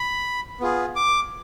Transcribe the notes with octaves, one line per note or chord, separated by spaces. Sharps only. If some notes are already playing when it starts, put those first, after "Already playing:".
Already playing: B5
B3 F4 G#4
D6